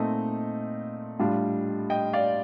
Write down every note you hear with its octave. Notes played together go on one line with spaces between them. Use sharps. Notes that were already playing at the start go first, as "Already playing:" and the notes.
Already playing: A#2 A3 C4 D#4 D#5
A2 G3 D4 F4
D#5 G5
D5 F5